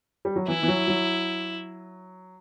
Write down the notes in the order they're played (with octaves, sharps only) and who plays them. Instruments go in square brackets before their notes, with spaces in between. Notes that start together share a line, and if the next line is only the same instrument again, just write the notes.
[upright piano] G3
F#3
[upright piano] E3 [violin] E4
[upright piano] E3
F#3
F#3